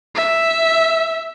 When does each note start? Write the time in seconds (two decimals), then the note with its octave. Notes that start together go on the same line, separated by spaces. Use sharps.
0.15 E5